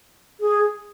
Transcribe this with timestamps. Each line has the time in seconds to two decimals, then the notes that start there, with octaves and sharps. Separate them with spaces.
0.40 G#4